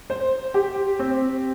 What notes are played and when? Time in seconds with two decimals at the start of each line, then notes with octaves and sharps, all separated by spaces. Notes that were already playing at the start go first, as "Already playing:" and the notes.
0.10 C5
0.54 G4
0.99 C4